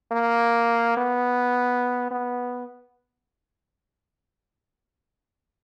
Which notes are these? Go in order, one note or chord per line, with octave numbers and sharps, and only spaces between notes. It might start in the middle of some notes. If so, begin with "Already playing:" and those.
A#3
B3
B3